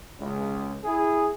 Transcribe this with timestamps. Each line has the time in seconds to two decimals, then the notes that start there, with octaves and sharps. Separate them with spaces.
0.20 C#2
0.84 E4 G#4